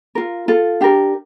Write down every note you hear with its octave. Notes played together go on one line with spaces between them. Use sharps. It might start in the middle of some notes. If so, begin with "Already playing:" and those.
F4 A#4
F4 A4
D4 G4 A#4